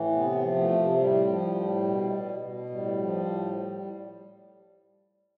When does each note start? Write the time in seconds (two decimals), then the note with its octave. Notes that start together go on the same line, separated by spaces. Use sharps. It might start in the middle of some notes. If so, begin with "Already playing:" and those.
Already playing: A2 E3
0.12 C3 B3
0.41 F3
0.56 A3
0.70 C3
0.98 A2 G3
1.27 F3
1.55 A2
1.84 B2
2.12 B2
2.41 B2
2.70 A2 G3
2.98 F3
3.26 A2